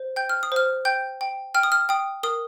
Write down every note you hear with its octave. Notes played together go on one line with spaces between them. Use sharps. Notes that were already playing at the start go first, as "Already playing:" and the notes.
Already playing: C5
G5 G6
F6
D#6
C5 F6
G5 G6
G5
G5 F6
D#6
F6
G5 D#6
A#4 D#6